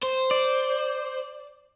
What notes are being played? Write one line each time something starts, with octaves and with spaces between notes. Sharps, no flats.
C5
D5